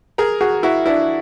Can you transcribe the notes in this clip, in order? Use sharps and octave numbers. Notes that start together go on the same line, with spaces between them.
G#4 A#4
F#4 G#4
E4 F#4
D4 E4